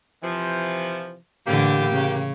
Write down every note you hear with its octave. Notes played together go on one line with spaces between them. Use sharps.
C3 E3 F3
A2 D3 E3 A#3 G4
C#3